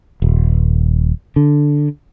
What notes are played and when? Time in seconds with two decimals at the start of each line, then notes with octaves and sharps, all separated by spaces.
0.22 D#1
1.36 D3